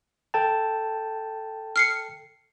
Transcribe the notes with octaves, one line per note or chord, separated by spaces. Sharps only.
A4 G5 A5
F6 C7 C#7